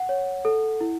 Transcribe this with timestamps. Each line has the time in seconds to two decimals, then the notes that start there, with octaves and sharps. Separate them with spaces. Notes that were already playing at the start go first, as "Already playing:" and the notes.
Already playing: F#5
0.09 C#5
0.45 A4
0.81 E4